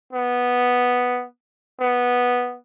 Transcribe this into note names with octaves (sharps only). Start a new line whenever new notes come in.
B3
B3